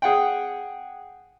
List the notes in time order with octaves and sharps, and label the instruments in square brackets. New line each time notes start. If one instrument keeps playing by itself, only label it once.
[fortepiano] G#4 F#5 G5